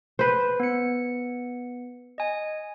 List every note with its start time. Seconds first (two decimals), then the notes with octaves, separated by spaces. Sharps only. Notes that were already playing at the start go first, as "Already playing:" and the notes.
0.19 B4 C5
0.60 B3 C#7
2.18 D#5 G#5